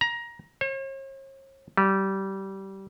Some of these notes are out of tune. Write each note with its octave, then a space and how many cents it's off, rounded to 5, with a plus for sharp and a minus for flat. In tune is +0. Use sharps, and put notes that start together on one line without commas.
A#5 +20
C#5 -45
G3 -20